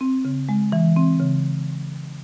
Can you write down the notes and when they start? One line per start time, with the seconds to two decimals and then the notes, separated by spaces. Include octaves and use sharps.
0.01 C4
0.25 C#3
0.49 G#3
0.72 E3
0.96 C4
1.20 C#3